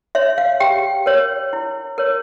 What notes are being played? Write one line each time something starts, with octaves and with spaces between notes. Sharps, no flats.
C#5 E5
F5
G4 G5
A#4 C#5
E4
A#4 C#5